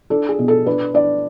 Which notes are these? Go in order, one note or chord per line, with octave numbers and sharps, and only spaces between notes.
D4 A4
G#4
B2
A4
D4 B4
D4 D5